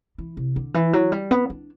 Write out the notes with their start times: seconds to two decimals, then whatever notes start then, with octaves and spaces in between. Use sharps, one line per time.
0.18 E3
0.37 C3
0.56 D3
0.74 E3
0.93 F#3
1.12 G3
1.31 B3
1.50 D4